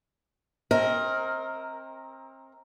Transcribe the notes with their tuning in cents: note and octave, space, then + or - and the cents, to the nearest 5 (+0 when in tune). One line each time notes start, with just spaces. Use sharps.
C4 +35 A#4 +0 D#5 +40